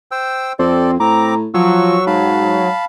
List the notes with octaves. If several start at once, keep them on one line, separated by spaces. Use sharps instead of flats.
C5 G5 E6
F2 C4 A4 D5
A2 C4 A#5 D6
F3 F#3 C#6 E6
G#2 F5 A5 B5